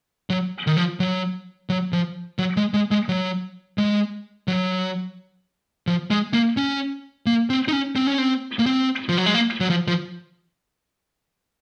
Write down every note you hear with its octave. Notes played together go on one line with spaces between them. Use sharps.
F#3
D#3
F3
F#3
F#3
F3
F#3
G#3
G#3
G#3
F#3
G#3
F#3
F3
G#3
A#3
C#4
A#3
C4
D#4
C#4
C4
C#4
C4
A#3
C4
F3
F#3
G#3
A#3
F#3
F3
F3